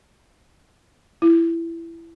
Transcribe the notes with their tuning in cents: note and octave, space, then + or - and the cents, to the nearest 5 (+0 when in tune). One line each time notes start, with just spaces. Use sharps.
E4 +15